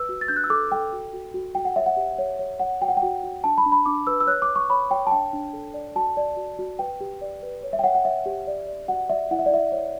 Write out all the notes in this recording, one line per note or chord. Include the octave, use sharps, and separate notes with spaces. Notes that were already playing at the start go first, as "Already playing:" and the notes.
Already playing: B4 E6
F#4
A6
D4 G6
F#6
E6
A4 D6
A4 G5
F#4
F#4
F#4
F#4 G5
F#5
C#5 E5
F#5
G4
C#5
C#5
C#5 F#5
F#4 G5
F#5
G5
F#4
F#4
D4 A5
B5
D4
B5
D4 D6
B4 E6
E6
C#5 F#6
D6
C#5
C#6
C#5 B5
C#5 G5
A5
D4 G5
D4
A4
D5
F#4 A5
D5
F#4
F#4
B4 G5
G4
D5
B4
C#5
E5
G5
C#5 F#5
F#5
C#5 E5
G4
D5
D5
F#4 F#5
D5 E5
E4 F#5
E5
D5
E4 E5
C#5